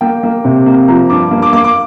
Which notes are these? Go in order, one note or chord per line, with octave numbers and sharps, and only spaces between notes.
A#3 G5
A#3
C3
A#3
F3 A#5
G2 D6
A#3
D6
A#3 D6
D6